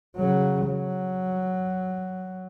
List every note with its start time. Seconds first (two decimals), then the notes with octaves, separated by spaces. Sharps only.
0.17 C#3 F#3
0.67 F#3